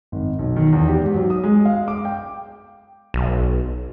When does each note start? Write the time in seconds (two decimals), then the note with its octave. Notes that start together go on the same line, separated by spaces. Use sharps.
0.12 G#1
0.39 B1
0.56 D#3
0.72 E2
0.88 G4
1.01 G#2
1.14 F#3
1.30 D#6
1.44 G#3
1.65 F5
1.88 D6
2.05 G5
3.14 B1